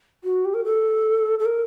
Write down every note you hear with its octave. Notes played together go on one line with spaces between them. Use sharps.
F#4
G4
A#4
A4
A4
A#4